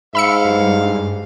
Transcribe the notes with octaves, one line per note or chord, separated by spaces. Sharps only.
G#2 F5 B5 E6 C#7
G2